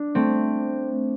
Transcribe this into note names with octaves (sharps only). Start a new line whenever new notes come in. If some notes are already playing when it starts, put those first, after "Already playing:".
Already playing: D4
A3 C4